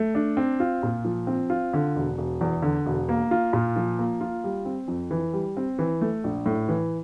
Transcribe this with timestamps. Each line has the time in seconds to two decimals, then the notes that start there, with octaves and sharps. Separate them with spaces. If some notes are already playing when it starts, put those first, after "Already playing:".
Already playing: A3
0.15 D4
0.37 C4
0.60 F4
0.83 A#2
1.05 F3
1.27 C4
1.50 F4
1.73 D3
1.96 E1
2.18 E1
2.41 E2
2.62 D3
2.86 E1
3.09 A#3
3.31 F4
3.53 A#2
3.76 F3
3.99 A#3
4.21 F4
4.44 G3
4.65 C4
4.88 F2
5.11 E3
5.33 G3
5.57 C4
5.79 E3
6.01 A3
6.24 A#1
6.46 A2
6.68 E3